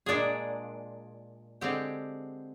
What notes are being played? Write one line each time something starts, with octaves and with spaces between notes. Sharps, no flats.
A#2 G#3 D4 G#4
D3 G#3 C4 G4